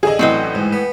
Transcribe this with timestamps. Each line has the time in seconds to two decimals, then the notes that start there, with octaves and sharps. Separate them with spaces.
0.03 A1 D3 G#4 D#5
0.19 A2 E3 F#3 C4 D#5
0.55 G#2
0.73 B3